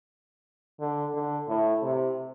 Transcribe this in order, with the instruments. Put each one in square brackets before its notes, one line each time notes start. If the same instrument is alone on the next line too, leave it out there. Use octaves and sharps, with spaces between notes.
[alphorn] D3
D3
A2
C3